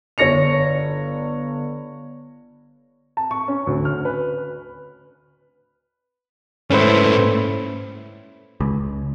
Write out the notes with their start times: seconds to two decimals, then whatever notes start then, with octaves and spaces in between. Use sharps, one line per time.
0.18 G1 C#5 A#6 C#7 F7
3.17 A5
3.31 C#6
3.48 C#4
3.67 D2
3.85 F6
4.05 B4
6.70 G#2 A3 C#4 E4 A4 B4 C5
8.61 C#2